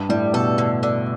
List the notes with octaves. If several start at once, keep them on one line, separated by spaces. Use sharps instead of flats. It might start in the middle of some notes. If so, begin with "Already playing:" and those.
Already playing: G2
A2 G3
B2 A4
D3
D3